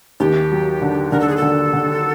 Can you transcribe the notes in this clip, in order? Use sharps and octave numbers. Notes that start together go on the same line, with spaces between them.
D#2 G4
F#3
D3
D3 A#4
A4
G#4
A4
D3
D3